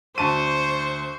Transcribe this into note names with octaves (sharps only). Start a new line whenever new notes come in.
D2 C5 A5 C#6 D#7